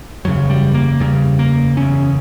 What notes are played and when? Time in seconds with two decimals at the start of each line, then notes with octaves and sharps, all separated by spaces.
0.25 F#1 E2 C#3 F#3
0.50 G3
0.74 A#3
1.00 F#1 E2 C#3 G3
1.39 A#3
1.77 F#1 E2 C#3 C#4